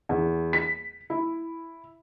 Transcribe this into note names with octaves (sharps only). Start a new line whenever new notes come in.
E2
B6
E4